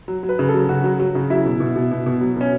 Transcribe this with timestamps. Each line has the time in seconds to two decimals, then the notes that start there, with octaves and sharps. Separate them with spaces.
0.08 F#3
0.23 F#3
0.29 B4
0.39 C#3
0.49 A4
0.54 F#3
0.69 C#3 F#4
0.84 F#3
1.00 F#3
1.15 C#3
1.30 F#3 E4
1.45 B2
1.60 B2
1.76 B2
1.91 B2
2.06 B2
2.21 F#3
2.36 B2 C#4